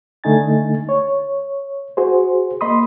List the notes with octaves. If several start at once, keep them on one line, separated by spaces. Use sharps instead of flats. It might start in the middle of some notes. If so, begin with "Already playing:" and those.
D3 A3 D#4 G#5 A6
C#5
F#4 G#4 C5
A#3 D#5 B5 C6 D#6